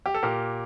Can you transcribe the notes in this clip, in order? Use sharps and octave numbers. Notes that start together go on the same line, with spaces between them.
G4
A4
A#2 G4 A#4